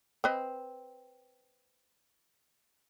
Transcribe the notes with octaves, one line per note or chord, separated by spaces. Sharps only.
C4 B4 D#5